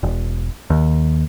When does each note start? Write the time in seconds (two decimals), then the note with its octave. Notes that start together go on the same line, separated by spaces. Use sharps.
0.03 E1
0.70 D#2